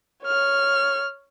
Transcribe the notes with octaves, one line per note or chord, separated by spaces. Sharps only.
C#5 F6